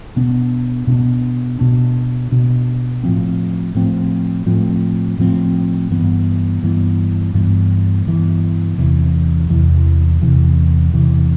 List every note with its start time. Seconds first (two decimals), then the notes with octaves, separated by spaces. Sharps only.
0.16 B2 B3 D4
0.87 B2 B3 D4
1.59 B2 B3 D4
2.32 B2 B3 D4
3.03 A2 F3 C4
3.75 A2 F3 C4
4.46 A2 F3 C4
5.19 A2 F3 C4
5.91 G2 E3 B3
6.63 G2 E3 B3
7.34 G2 E3 B3
8.06 G2 E3 B3
8.78 E2 C3 E3
9.50 E2 C3 E3
10.22 E2 C3 E3
10.94 E2 C3 E3